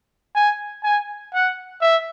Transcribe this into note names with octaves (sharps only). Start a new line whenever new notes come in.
G#5
G#5
F#5
E5